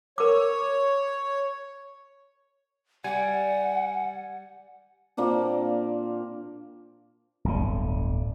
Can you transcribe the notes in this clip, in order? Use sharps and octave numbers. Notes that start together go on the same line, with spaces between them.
A#4 C#5 D6
G3 F#5 G#5
A#2 A#3 C4 D4
D1 G1 D3